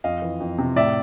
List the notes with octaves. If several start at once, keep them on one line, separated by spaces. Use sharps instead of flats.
F2 D#5 F5
E3
F2
C3
A2 D5 E5